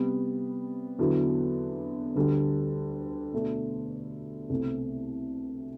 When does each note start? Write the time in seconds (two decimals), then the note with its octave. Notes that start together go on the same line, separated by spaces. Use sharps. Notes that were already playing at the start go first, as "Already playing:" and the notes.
Already playing: C3 G3 B3
0.99 E2 D3 F#3 B3 E4
2.15 D2 D3 G3
3.34 B2 A3 D4
4.50 C2 B2 A3 C4